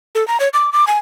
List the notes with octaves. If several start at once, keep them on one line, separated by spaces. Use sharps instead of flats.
A4
A#5
C#5
D6
D6
G#5